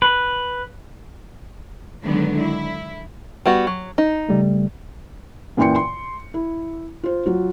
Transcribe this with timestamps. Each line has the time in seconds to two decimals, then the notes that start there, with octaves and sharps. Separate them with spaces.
0.02 B4
2.04 D3 D#3 F#3 G#3 B3
2.38 E4
3.46 G3 B3 F#4
3.67 F#3
3.98 D#4
4.29 C#3 G3 A3
5.57 F#2 A#2 E3 G5 C6 C#7
5.76 C6
6.34 E4
7.04 F4 C5
7.26 F#3 F4